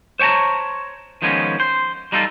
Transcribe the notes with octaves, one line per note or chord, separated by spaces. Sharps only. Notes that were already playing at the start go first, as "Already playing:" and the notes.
C5 C#5 G5 A5 A#5
D#3 F3 G#3 B3 C#4
C5
G3 D#4 F4 A4